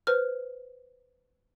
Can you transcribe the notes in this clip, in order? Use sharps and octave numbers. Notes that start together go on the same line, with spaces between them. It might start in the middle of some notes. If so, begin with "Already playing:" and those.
B4 C5 F6